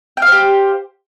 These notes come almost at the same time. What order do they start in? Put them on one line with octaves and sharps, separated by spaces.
G5 F5 C5 G4